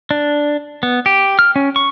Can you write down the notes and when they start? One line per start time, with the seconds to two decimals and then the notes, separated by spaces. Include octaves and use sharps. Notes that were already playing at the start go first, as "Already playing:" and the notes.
0.11 D4
0.83 B3
1.06 G4
1.39 F6
1.56 C#4
1.76 C#6